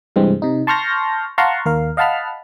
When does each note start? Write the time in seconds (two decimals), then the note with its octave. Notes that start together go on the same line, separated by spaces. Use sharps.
0.16 G2 C3 E3 G#3 C4
0.42 C3 D#4
0.67 A5 C6 C#6 F6 G6 A#6
1.38 F5 F#5 A5 A#5 C6 C#6
1.66 D#2 A#4 F5
1.97 D#5 F5 F#5 A5 B5 F6